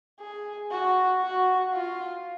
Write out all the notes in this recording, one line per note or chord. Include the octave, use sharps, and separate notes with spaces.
G#4
F#4
F#4
F4